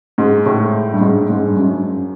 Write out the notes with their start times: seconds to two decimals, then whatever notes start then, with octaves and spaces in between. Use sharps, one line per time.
0.18 G#2
0.46 A2
0.92 G2
1.01 G#2
1.30 G#2
1.46 G2
1.57 F#2